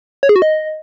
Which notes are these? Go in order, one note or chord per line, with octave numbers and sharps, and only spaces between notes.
C#5
G#4
F#4
D#5